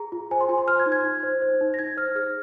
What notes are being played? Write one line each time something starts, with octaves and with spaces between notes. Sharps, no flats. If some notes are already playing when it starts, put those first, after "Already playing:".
Already playing: G#4 A#5
F4
C5 G#5
C6
F4 G#5
C6
C5 F6
G#6
D#4
G#6
D#4
C5
C5
D#4
A#6
D#4 G#6
C5 F6
G#4 F6